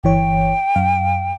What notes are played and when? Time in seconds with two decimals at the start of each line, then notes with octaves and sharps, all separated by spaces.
0.04 G1 E3 C#5 G5
0.76 F#2 F5